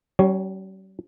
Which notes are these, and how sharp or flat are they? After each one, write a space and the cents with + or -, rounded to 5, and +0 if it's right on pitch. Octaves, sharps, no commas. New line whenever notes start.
G3 -45 C#4 +0 C#5 +0